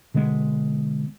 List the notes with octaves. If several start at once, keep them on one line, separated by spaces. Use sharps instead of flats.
B2 D3 G#3 B3